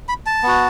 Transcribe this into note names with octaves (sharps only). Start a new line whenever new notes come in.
B5
A5
B3 F#4